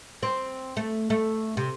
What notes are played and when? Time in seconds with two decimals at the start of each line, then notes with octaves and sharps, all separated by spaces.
0.23 C4
0.77 A3
1.10 A3
1.57 C3